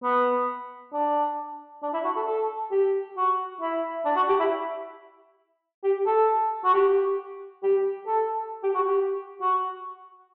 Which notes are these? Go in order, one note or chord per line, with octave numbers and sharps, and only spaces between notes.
B3
D4
D4
E4
F#4
A4
A4
G4
F#4
E4
D4
F#4
G4
E4
G4
A4
F#4
G4
G4
A4
G4
F#4
G4
F#4